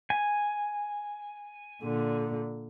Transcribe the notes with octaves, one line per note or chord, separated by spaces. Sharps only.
G#5
A#2 D3